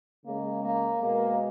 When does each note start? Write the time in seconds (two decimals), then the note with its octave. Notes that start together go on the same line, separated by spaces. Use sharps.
0.25 C#3 G#3 A#3
0.63 A#3
1.01 B2 G#3 A#3